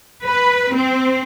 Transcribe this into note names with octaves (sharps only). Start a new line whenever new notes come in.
B4
C4